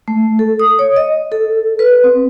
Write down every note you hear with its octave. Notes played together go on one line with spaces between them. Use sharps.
A3
A4
D#6
C#5
D#5
A4
B4
C4